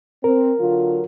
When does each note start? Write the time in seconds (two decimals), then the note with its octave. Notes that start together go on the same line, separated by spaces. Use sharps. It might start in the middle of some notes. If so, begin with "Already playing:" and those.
0.24 C4 A#4
0.59 D3 F#3 F4